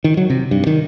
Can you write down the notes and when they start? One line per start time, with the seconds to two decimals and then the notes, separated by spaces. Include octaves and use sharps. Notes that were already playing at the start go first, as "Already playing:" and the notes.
0.04 D#3
0.17 F#3
0.30 C3
0.51 G2
0.67 D#3